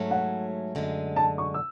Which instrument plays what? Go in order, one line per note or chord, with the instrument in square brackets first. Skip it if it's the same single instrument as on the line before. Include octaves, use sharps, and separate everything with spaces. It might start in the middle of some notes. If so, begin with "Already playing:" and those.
Already playing: [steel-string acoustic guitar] G#2 F#3 A3 C#4
[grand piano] F#5
[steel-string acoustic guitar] F#2 D3 G#3
[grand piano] A5
C#6
E6